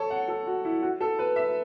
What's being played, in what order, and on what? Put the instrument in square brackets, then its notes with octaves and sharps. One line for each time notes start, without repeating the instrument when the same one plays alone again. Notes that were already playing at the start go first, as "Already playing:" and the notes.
Already playing: [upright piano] A4 C#5
F#5
A4
F#4
E4
F#4
A4
B4
E5